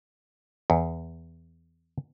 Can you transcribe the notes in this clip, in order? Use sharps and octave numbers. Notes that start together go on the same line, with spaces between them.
E2